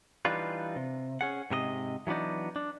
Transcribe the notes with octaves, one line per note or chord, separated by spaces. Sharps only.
E3 G3 D4 D#4 F4 B4
C3
C#4 G#4 F#5
G#2 C3 A#4 D#5
E3 F#3 B3 D4 D#4
D4